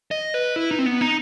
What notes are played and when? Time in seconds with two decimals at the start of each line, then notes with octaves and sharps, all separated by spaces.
0.11 D#5
0.34 B4
0.56 E4
0.71 D#4
0.79 C4
0.86 B3
1.01 D#4